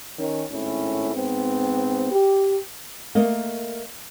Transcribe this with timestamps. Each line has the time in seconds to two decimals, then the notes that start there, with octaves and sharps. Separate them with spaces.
0.18 D#3 C#4
0.51 G#1 A2 C#4 E4
1.13 G#2 B3 C4
2.11 G4
3.15 A3 A#3 A#4 D#5 F5